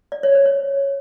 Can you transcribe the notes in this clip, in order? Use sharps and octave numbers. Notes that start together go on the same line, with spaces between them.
D5
C#5
C5
C#5